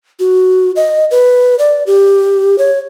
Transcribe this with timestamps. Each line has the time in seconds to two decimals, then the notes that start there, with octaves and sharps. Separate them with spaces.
0.20 F#4
0.76 D#5
1.11 B4
1.59 D5
1.87 G4
2.58 C#5